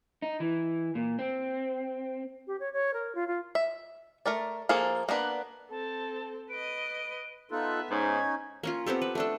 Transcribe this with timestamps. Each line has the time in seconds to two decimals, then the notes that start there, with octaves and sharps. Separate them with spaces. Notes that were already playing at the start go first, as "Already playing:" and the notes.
0.22 D#4
0.40 E3
0.95 A#2
1.19 C4
2.47 G4
2.60 C#5
2.73 C#5
2.94 A#4
3.15 F4
3.27 F4
3.55 E5
4.26 A3 A#4 D5
4.69 F3 A#3 G#4 A4
5.09 A#3 B3 D4 B4
5.70 C4 A4 A5
6.50 B4 D#5 D7
7.51 B3 D#4 F4 A4 E5 F#6
7.90 G#2 C#4 D#4 G#6
8.63 A#3 C#4 F4
8.86 B3 C4 G4 A4
9.02 B4
9.15 A3 D4 A4